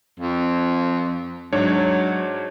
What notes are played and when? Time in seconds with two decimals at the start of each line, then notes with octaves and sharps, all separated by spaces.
0.19 F2
1.53 G#2 F#3 D4 C#5